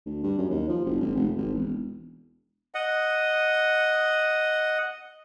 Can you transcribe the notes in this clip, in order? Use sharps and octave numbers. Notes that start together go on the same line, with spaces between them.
D2
G2
F#2
D#2
F3
F#1
G#1
F1
G#1
E1
D#5 F#5